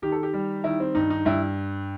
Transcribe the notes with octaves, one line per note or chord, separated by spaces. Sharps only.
D#3 G4
A4
G4
G3
D#3 E4
C4
G2 D#4
D#4
G2 E4